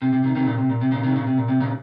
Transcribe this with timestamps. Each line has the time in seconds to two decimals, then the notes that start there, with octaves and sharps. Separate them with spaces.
0.02 C3
0.13 C3
0.23 C3 D#3
0.35 C3 D#3
0.47 A#2 C#3
0.58 C3
0.69 A#2
0.81 C3
0.92 A#2 C#3
1.03 C3 D#3
1.15 A#2 C#3
1.27 C3
1.37 A#2
1.48 C3
1.60 A#2 C#3